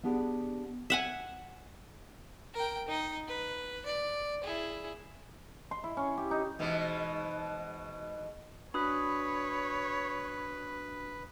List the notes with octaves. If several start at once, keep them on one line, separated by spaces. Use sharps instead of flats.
B3 D4 G4 G#4 D5 F#5
E5 F#5 G#5
A#4 G5
D#4 D#5
B4
D5
E4 G#4
C6
E4
C#4
G4
D#4
G#2 B2 E3
D4 F#4 B4 C#5 B5 D#6 F#6